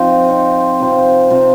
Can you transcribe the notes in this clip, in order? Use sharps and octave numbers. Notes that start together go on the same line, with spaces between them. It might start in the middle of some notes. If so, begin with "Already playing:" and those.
Already playing: F3 C4 D#4
F3 C4 D#4
C3 F3 C4
C3 F3 C4